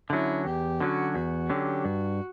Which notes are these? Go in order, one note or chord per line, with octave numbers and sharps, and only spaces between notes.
D3 F#3 C#4 E4
E2 G4
D3 F#3 C#4 F#4
E2 F#4
D3 F#3 C#4 G4
G2 F#4